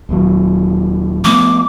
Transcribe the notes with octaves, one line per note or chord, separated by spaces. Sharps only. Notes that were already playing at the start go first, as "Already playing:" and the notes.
D#1 D#2 F#3
F3 A3 B3 D6